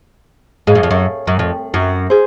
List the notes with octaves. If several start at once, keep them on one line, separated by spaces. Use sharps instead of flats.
G#2 G#4 C#5 F5
F#2
F2
F#2
F#2
F2
F#2
G#4 C5